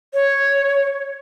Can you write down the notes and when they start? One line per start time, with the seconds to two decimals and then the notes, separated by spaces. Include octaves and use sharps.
0.14 C#5